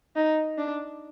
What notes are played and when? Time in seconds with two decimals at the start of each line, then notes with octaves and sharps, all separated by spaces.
0.16 D#4
0.58 D4